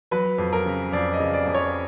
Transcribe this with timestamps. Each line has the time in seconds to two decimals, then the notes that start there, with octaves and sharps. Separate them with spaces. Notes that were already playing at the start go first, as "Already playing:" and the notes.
0.11 F#3 B4
0.38 F2
0.53 A#4
0.66 C#3
0.92 F2 D5
1.13 D#5
1.20 C#3
1.33 D5
1.46 F2
1.54 C#5